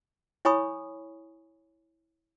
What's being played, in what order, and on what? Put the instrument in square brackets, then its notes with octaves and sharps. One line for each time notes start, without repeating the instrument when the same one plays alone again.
[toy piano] E4 C#5 G#5 B5 C#6 D#6